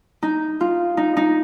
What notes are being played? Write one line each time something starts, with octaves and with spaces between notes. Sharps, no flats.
D#4
F4
D#4
D#4